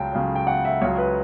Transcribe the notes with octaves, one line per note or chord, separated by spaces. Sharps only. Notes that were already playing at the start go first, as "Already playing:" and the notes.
Already playing: C#2 C#3 F#3 G5 A5
C#2 C#3 F#3
G5
F#5
E5
C#2 C#3 F#3 C#5
B4